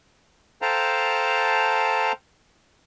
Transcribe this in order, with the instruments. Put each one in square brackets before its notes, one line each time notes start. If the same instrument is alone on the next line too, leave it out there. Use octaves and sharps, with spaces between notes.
[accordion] A4 C5 F5 G5 A5 A#5